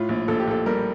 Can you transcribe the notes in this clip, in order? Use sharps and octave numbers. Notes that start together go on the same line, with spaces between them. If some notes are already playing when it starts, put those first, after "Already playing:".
Already playing: A2 F4
A#1
A#1 A4
G4
A#1 A4
G3 A#4